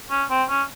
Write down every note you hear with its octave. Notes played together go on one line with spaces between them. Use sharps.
C#4
C4
C#4